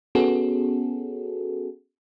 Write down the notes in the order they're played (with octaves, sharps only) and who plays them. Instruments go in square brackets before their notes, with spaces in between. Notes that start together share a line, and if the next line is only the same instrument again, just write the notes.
[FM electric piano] B3 C#4 F#4 G#4 A4